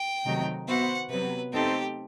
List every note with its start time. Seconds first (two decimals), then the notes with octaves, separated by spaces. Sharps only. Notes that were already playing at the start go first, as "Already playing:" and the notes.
Already playing: G5
0.25 C3 D#3 F#3 A3 D#4
0.68 B3 F#4 C5 E5 F#5
1.10 C3 F#3 B3 B4
1.53 A3 C4 D#4 G4 A4 C5